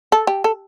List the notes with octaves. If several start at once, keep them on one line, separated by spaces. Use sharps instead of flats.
A4
G4
A4